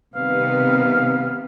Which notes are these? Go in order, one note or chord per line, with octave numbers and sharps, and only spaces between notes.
C3 D#3 G3 B3 B4 F5